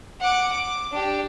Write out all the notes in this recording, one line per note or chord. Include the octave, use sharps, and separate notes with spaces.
F#5 D6
D6
D4 G4